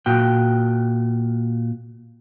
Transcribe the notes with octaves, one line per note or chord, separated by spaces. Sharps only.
A#2 F#4 G5